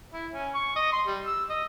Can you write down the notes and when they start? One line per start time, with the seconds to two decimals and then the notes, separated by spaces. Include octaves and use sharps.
0.13 E4
0.33 C#4
0.54 C#6
0.76 D#5
0.93 C6
1.06 G3
1.26 E6
1.49 D#5